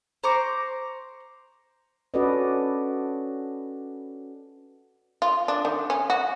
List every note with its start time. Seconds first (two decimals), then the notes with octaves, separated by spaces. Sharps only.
0.24 C5 A#5 C#6 D6
2.14 C#4 F#4 A4 B4 D5 D#5
5.22 F4
5.48 D4
5.65 D#3
5.90 C#4
6.10 F#4